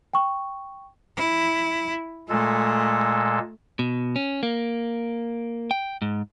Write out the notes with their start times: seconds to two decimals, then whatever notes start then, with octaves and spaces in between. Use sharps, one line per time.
0.13 G5 C#6
1.17 E4
2.29 A#2 G#3 A3 A4
3.79 B2
4.16 C#4
4.43 A#3
5.71 G5
6.02 G#2